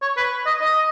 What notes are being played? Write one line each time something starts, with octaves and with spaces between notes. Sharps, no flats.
C#5
B4
D#5
D#5